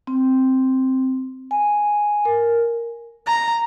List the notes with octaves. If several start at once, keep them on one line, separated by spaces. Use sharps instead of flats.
C4
G#5
A#4
A#5